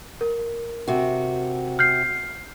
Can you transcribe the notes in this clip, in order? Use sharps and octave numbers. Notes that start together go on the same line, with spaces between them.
A#4
C3 F#4
F6 G6 C7